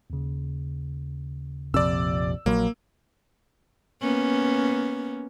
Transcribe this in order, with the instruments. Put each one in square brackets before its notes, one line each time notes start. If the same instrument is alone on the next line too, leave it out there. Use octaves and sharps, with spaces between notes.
[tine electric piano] D#2 C#3
[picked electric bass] A#1 F2 C3 [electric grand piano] D5 E6
[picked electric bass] A#1 F#3 [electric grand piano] A#3
[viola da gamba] A#3 B3 C#4